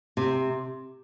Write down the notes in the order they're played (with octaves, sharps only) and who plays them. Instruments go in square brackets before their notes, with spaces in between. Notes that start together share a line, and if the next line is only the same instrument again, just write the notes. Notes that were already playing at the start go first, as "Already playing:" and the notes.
[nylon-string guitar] C3